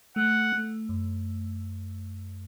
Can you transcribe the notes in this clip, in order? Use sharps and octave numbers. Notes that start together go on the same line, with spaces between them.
A3 F#5
A3
F#2